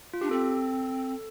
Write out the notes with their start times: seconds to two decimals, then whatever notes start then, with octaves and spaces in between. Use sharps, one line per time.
0.13 F4
0.21 D4 G4
0.31 C4 A4